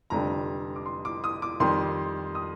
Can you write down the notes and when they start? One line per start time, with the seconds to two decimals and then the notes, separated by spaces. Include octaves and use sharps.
0.10 F1 F2 D3 G3 A#5
0.76 D6
0.86 C6
1.05 D6
1.24 D#6
1.42 D6
1.60 F2 D#3 G3 C6
2.35 D#6